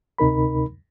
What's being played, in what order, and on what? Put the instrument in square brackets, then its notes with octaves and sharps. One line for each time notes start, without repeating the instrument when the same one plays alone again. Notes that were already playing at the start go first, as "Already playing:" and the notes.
[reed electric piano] D2 C3 D#4 A#4 B5